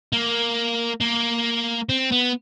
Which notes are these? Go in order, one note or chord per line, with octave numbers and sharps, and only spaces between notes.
A#3
A#3
C4
B3